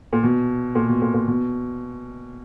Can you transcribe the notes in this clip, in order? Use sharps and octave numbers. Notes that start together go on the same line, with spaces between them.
A#2
B2
A#2
B2
A#2
A#2
B2